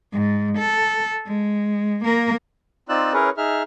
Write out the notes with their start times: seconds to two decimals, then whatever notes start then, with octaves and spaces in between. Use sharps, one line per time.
0.13 G#2
0.58 A4
1.26 G#3
2.05 A#3 A#4
2.89 C4 D#4 F4 D5 E6 F#6
3.13 C#4 E4 G#4 A#4 B4 C#5
3.37 D#4 G#4 E5 F6